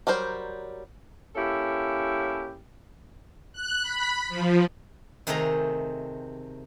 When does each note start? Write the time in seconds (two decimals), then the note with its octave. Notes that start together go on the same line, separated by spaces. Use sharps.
0.07 F#3 G3 A#4 C5
1.36 A#3 C#4 E4 G4 A4
3.53 F#6
3.82 B5
4.29 F3
5.27 C3 D#3 A3 G#4 C5 A#5